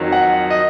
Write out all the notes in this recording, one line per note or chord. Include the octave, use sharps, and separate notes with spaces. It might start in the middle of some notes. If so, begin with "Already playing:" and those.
Already playing: F2 D#3 F#3
F#5
D#5